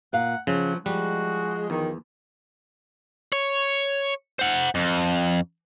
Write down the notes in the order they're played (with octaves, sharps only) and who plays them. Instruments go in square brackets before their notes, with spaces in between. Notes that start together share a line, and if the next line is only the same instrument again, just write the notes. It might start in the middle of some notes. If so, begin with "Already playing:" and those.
[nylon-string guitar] A#2 F5 [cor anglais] F#5
[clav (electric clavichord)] C#3 [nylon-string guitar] F3 [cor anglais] F#3
[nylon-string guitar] F3 [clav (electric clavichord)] G3 [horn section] G#3 [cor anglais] F#4
[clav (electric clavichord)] E2 [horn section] D#3
[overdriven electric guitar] C#5
C5 F#5
F2